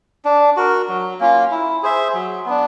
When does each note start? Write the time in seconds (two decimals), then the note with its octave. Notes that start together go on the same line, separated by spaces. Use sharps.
0.25 D4
0.57 F#4 A#4
0.89 F#3
1.20 A#3 C#4 F4
1.51 E4
1.83 G#4 C5 E5
2.14 F#3
2.46 B3 D4